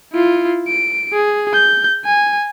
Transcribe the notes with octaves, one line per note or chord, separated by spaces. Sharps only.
E4 F4
D7
G#4
G6
G#5